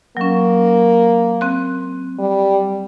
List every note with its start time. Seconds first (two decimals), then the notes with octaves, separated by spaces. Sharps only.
0.17 F#3 A#3 C#4
1.41 C4 F#6
2.19 G3